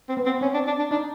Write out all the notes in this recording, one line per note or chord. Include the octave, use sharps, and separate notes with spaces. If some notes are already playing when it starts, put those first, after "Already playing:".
C4
B3
C4
C4 C#4
D4
D4
D4
D4 D#4